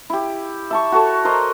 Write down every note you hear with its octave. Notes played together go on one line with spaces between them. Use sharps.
E4 G4
E5 A5 C#6
F#4 A4 C#5 A5
A#4 C5 D#5 A#5